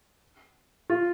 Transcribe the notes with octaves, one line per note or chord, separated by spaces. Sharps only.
F4